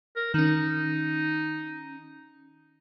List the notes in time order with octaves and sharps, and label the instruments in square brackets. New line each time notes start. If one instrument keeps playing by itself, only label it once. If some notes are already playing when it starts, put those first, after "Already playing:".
[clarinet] A#4
[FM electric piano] D#3 C#4 [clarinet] D#4